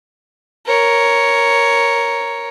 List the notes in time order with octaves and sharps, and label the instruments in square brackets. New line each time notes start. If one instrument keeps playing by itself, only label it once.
[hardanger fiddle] A#4 C#5